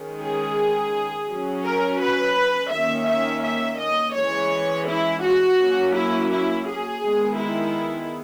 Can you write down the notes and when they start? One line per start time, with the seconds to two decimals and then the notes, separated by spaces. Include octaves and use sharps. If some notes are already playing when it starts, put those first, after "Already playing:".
Already playing: D#3 G#3 C#4
0.22 G#4
1.30 F#3 C#4
1.66 A#4
2.02 B4
2.73 D#3 A#3 C#4 E5
3.09 E5
3.45 E5
3.81 D#5
4.17 E3 G#3 C#4 C#5
4.89 E4
5.25 F#4
5.61 F#3 A#3 C#4
5.97 E4
6.32 E4
6.68 G#4
7.04 D#3 G#3 B3
7.40 E4